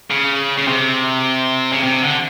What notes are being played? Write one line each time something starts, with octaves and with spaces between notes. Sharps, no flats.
C#3
C#3
C3
C#3
C3
D3